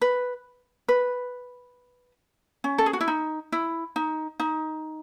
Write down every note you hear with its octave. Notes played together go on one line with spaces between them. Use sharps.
B4
B4
C#4
A4
G#4
F#4
E4
D#4
E4
D#4
D#4